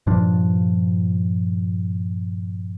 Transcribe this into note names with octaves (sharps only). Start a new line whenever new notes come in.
G2 A#2 F3 D4